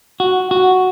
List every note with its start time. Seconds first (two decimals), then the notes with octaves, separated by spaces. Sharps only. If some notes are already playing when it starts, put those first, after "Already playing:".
0.20 F#4
0.51 F#4